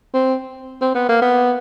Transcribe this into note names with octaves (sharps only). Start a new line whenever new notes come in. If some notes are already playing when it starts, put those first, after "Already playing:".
C4
C4
B3
A#3
B3